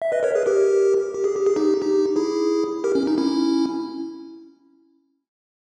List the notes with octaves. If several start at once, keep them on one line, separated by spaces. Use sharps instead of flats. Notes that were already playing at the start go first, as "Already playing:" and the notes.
E5
B4 D#5
A#4 C#5
G#4 B4
G4 A#4
G4
G#4
G4
G#4
D#4 G4
D#4 G4
E4 G#4
G4 A#4
C#4
D#4
C#4 E4